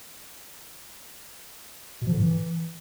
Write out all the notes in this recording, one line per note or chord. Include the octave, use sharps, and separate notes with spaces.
B2
F3
D3
A2
E3